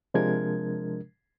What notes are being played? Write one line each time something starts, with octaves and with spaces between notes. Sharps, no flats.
C3 F3 G#3 D4 A#4 G#6